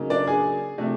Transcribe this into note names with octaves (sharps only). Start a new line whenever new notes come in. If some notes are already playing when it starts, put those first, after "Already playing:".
Already playing: C#3 F#3 A#3 D#4
D4 D5
G#4 G#5
C3 F3 A3 D4